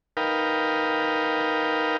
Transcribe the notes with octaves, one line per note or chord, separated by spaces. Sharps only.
D#4 A#4 B4 F5 G5